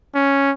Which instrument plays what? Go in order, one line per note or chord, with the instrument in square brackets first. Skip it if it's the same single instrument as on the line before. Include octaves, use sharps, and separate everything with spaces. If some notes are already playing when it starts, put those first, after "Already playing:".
[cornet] C#4